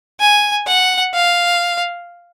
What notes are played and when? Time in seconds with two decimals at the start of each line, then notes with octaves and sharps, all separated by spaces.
0.20 G#5
0.67 F#5
1.14 F5